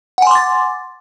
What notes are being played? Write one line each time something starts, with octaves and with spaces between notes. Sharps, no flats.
F#5 G#5 C6 D6 A6